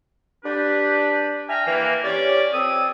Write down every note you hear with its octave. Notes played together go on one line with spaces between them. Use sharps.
D4 G4 B4
E5 G5 G#5 A#5 F6
E3 A#3
C#4 G4 C#5 D5
F2 C4 A4 D#6